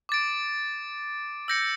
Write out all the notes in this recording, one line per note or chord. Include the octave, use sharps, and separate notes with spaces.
D6 A6 D7
E6 G6 A#6 C#7